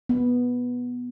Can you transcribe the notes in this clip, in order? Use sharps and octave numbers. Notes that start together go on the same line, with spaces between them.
B3